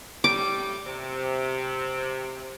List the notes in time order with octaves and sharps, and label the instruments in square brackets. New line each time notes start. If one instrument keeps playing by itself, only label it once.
[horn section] A2 G3 [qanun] D6
[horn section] C3